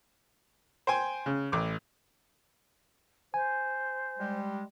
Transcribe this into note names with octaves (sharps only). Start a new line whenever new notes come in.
C5 G5 G#5 C6
C#3
A1 D6
C5 G#5
G3 G#3